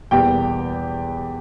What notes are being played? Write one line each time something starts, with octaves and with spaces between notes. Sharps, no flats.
E2 B2 G3 A#3 G4 G5